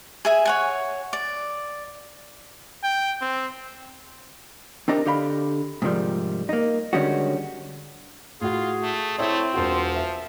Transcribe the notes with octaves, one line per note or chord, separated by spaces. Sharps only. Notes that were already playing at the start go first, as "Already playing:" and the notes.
G#4 E5 G#5
C#5 F#5 G#5
D5
G5
C4
C4 D4 D#4 G4 A#4
D3 G4 F5 B5
G#2 C3 D#3 F3 G3
A#3 D#4
D3 D#3 G3 G#3 C#4 F#4
A2 F4 F#4 G#4
A3
A3 C4 E4 C#5
E1 F3 F4 F#4
E5